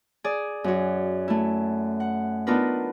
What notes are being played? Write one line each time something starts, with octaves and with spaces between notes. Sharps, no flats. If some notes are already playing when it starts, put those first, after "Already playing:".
G#4 D5
F#2 F#4
A3 E4
F#5
B3 D4 D#4 F4 A#4 B4